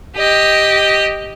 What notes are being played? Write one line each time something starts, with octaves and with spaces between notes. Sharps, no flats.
G4 D#5